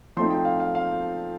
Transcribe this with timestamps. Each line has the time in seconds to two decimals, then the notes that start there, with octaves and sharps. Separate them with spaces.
0.17 F3 A3 C4 D#4 C6
0.31 G5
0.45 F5
0.60 F5
0.75 F5